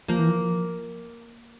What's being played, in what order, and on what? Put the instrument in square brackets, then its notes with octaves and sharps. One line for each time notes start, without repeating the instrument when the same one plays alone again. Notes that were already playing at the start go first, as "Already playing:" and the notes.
[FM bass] F3 [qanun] A#3
[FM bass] E3
F3